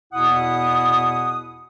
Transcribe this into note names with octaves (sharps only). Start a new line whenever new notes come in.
E2 B2 E4 F#5 D#6